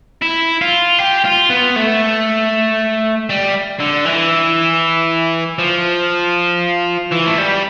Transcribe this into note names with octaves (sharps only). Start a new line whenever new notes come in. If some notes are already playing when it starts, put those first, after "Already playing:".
E4
F4
G4
F4
B3
A3
G3
D3
E3
F3
E3
A3
G3